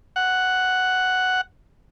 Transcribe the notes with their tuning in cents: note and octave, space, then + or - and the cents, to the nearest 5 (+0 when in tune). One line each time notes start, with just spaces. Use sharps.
F#5 +5